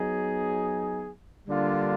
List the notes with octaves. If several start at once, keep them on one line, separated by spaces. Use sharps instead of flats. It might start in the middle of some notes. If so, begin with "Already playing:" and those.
Already playing: F#3 B3 D#4 G#4
D3 G3 A#3 D4 F4